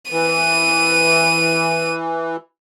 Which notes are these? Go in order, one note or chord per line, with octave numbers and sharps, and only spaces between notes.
E3 D#7